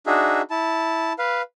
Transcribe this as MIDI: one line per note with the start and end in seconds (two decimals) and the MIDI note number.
0.06 0.42 62
0.06 0.42 63
0.06 0.42 66
0.06 0.42 68
0.06 0.42 76
0.50 1.13 64
0.50 1.13 81
1.19 1.42 71
1.19 1.42 77